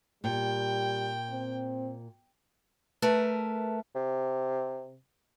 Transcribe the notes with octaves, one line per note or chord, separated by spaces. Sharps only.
A#2 G3 G5
C4
A3 A#4 B4 A5
C3